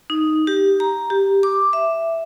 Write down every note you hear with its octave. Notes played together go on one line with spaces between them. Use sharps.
D#4
G4
A#5
G4
D6
E5